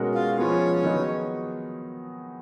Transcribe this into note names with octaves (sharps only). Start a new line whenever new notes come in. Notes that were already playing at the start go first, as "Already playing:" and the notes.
Already playing: B2 G#3 C#4 F#4 A#4
F4 F5
F3 G#3 B3 C#4 F4 C#5
D#3 F#3 B3 D#4 G#4